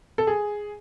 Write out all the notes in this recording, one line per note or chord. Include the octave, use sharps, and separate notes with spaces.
A4
G#4